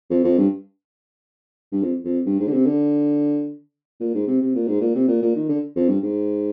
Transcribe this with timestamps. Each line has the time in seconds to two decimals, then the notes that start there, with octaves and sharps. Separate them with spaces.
0.10 F2
0.24 F2
0.38 G2
1.72 G2
1.83 F2
2.04 F2
2.26 G2
2.40 G#2
2.47 D3
2.53 C3
2.66 D3
4.00 A#2
4.14 G#2
4.27 C3
4.42 C3
4.55 A#2
4.68 G#2
4.81 A#2
4.95 C3
5.08 A#2
5.22 A#2
5.36 D#3
5.49 D3
5.76 F2
5.89 G2
6.03 G#2